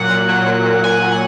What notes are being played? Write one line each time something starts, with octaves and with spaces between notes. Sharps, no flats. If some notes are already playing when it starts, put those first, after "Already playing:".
Already playing: A#2 F#3 F#5
A#2
F#3
A#2
A#2
A#2 G#5
F#3
F#5